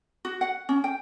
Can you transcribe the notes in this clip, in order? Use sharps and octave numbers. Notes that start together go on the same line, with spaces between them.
F#4
F#5
C#4
G5